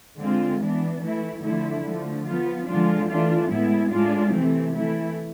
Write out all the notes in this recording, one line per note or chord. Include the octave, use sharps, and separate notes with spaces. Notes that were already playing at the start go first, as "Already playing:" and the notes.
D3 G#3 C4 F4
E3 B3 D4
E3 A3 E4
D3 F3 A3 E4
D3 F3 A3
F3 B3 F4
D3 F3 G#3 D4 F4
E3 A3 D4 F4
A2 G#3 B3 E4
A2 G#3 D4 F4
C3 E3 A3 C4
E3 A3 E4